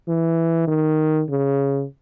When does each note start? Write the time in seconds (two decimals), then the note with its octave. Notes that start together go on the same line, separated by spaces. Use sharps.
0.08 E3
0.68 D#3
1.29 C#3